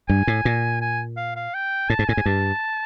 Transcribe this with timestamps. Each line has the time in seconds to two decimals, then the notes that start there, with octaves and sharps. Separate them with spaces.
0.09 G2 G#5
0.27 A2
0.45 A#2
0.81 G#5
1.17 F5
1.36 F5
1.54 G5
1.89 A2 A5
1.99 G#2
2.08 A2 G#5
2.17 G#2
2.26 G2 A5